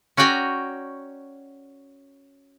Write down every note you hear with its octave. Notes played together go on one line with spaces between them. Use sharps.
C#4 F#4 D5 G5 G#5 A#5